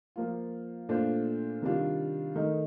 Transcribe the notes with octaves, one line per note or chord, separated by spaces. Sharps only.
F3 A#3 F4
A#2 A3 D4 F4 C5
C3 D#3 G3 D4 F4
D#3 A3 D#4 A#4